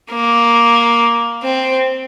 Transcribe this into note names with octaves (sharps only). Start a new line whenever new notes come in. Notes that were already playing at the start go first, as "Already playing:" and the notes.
A#3
C4